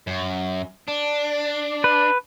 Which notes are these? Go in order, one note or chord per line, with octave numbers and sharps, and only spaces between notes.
F#2
D4
B4